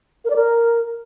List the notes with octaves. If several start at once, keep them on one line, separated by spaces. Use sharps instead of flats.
A#4
D5
A#4